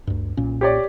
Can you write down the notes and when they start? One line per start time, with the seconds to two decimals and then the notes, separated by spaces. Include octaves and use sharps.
0.07 D2 G2
0.37 B1 A#2 C#4
0.61 G4 C#5 D5